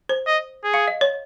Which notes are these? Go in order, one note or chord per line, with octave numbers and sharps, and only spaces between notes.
C5
D#5
G#4
F5
D#5
C#5